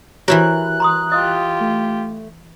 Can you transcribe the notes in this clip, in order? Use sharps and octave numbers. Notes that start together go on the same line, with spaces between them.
E3 E4 F#4 G4 A#4 C#5 F#6
A#5 C6 D#6
F4 G4 D#5 D#6
A3